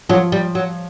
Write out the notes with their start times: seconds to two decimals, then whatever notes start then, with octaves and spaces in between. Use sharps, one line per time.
0.09 F3 F#3
0.32 G3
0.55 F#3